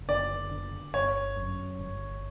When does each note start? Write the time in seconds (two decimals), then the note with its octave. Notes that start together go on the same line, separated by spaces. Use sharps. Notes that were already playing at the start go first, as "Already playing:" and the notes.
Already playing: F#1
0.09 D3 D5
0.51 D3
0.93 G1 C#5
1.36 F#2
1.79 G1